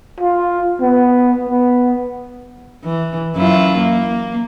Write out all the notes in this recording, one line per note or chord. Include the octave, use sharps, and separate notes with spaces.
F4
B3
B3
E3
F#2 E4 F4
A#3